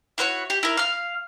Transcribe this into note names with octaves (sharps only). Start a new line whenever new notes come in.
E4 F#4 C5 C#5
G4
E4 A#4
F5 F6